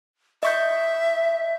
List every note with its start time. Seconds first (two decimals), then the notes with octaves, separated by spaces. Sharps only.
0.43 D#5 E5 C#6 G6